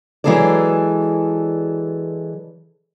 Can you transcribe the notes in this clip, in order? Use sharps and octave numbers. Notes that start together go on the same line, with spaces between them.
E3 F#3 G#3 G#4 A4 D5